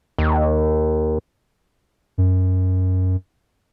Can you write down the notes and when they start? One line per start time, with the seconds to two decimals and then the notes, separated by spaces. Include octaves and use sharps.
0.19 D#2
2.18 F#2